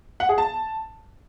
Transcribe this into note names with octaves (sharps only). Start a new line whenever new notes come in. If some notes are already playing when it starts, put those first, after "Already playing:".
F#5
G#4
A5